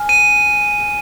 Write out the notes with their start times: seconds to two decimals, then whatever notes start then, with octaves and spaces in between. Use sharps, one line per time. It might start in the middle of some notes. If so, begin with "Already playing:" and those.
Already playing: G#5 F6
0.09 D#7